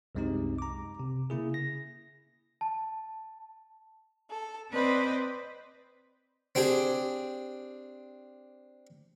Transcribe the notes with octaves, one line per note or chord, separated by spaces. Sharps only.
C2 F#2 G#3 C4 D#4 G4
A#5 D6
C3
C#3 A#3 E4 G#4
A#6
A5
A4
C4 B4 C5 D5 D#5
C4 D4 G4 G#4